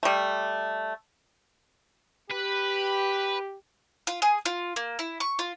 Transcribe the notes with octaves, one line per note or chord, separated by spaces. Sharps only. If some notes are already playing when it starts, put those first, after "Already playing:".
G3 A3
G4 B4
F4
G#4
F4
A#3
E4
C#6
F4